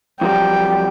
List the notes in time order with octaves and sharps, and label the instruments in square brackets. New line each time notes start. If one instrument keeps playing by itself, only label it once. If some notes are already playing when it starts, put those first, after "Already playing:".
[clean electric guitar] F2 F#3 G3 [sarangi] G5